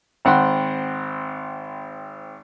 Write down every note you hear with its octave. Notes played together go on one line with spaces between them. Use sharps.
G#1 C4 F#5 B5 C6